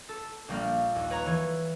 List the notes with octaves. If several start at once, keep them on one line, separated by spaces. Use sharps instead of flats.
A4
A#1 G3 A#3 F6
D#2
B4 C#5 A#5
E3 C#5